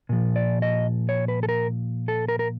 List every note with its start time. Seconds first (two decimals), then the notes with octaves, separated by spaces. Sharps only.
0.09 A#2 F3
0.36 D5
0.62 D#5
1.09 C#5
1.28 B4
1.43 A4
1.49 A#4
2.08 A4
2.28 A#4
2.39 A#4